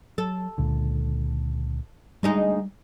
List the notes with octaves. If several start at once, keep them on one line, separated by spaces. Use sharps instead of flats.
F#3 A4
C#2 A#2 D3
D2 G3 G#3 D#4